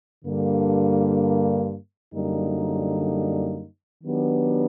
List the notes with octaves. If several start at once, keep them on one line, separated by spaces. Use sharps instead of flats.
G2 D3 G3 A#3
F#2 D3 G3 A#3 D#4
D#3 F#3 B3 D4 G4